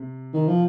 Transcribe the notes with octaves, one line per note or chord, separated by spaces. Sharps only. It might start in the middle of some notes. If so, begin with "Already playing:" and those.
Already playing: C3
D#3
F3